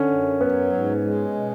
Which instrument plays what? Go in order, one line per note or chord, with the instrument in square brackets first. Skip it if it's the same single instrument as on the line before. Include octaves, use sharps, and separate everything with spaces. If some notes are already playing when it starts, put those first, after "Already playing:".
Already playing: [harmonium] D3 [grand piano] C#4
[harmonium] F#2
[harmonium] F#3 [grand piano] B3
[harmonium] G#2
G#3
B2